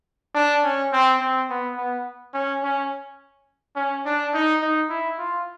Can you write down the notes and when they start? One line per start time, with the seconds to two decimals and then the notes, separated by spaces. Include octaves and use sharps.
0.35 D4
0.64 C#4
0.93 C4
1.20 C4
1.50 B3
1.78 B3
2.34 C#4
2.63 C#4
3.76 C#4
4.05 D4
4.34 D#4
4.62 D#4
4.90 E4
5.19 F4